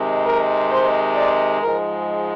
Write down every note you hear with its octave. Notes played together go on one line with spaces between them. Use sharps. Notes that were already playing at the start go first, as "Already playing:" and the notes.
Already playing: C3 D#3 G#3
A#4
C5
D5
G#2 F3 G#3 A#4